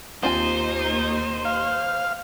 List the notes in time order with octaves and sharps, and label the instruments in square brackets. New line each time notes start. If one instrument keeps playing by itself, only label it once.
[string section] D#2 D#4 [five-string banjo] C4 F4 G#5 [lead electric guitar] C5
[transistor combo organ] F5